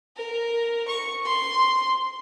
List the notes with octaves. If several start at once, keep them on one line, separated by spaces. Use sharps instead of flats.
A#4
C#6
C6